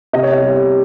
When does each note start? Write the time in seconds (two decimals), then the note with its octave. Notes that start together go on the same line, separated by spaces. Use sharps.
0.13 C3 D#5
0.23 C#5
0.32 D#5
0.42 G3